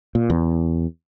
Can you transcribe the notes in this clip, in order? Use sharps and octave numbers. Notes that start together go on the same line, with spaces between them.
A#2
E2